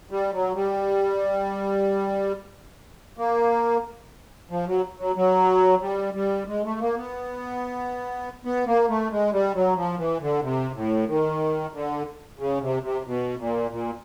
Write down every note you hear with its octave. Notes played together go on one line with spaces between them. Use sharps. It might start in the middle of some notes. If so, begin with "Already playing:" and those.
G3
F#3
G3
A#3
F3
F#3
F#3
F#3
G3
G3
G#3
A3
A#3
B3
B3
A#3
A3
G#3
G3
F#3
F3
E3
D3
C3
A2
D#3
D3
C#3
C3
C3
B2
A#2
A#2